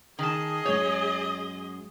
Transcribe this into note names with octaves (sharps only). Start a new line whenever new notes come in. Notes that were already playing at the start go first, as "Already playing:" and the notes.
D#3 G#4 D#5 A5
F#2 G#3 C#5